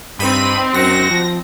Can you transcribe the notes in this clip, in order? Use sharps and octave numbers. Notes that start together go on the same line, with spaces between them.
G2 C4 D#4 B5 D#7
F#2 F#4 A#6
F3